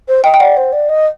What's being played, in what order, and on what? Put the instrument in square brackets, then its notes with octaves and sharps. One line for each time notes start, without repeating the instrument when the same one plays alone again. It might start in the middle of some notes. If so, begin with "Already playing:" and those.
[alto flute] C5
[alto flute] D#5 [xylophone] G5
[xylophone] G5
[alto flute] D5 [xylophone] F#5
[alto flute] C5
D5
D#5